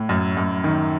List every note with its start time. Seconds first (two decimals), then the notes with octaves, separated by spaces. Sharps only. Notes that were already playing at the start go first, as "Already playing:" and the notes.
Already playing: A2
0.09 F#2
0.37 F#2
0.64 D#3